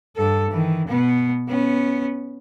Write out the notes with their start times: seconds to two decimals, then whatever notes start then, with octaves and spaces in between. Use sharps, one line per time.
0.16 G2 A4
0.51 D#3 E3
0.88 B2 B3
1.48 B3 C#4